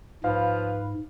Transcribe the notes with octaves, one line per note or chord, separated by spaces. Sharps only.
G#2 F3 B4 F5